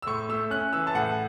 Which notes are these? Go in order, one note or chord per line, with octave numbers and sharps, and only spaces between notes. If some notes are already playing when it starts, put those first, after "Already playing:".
E6
A2 C#6
A3 E6
C#4 F#6
E3 E6
A5
A2 F#5